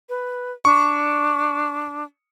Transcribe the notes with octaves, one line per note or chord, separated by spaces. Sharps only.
B4
D4 C#6